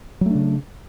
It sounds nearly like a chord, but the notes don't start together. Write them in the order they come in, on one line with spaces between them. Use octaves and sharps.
F#3 A3 D4 C#3